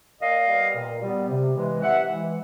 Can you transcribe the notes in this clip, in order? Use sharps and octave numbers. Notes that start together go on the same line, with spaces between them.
A#2 D#5 F5
G3 B3
A#2
G3 B3
C3
E3 G#3
C3 E5 F#5
E3 G#3